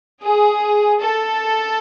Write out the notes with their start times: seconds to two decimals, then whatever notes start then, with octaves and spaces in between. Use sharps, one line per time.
0.22 G#4
0.99 A4